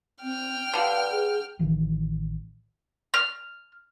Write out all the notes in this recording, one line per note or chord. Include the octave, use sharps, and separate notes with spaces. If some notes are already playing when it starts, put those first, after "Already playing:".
C4 G5 F6
D3 G3 B4 F5
G#4
A1 D#3 E3
F6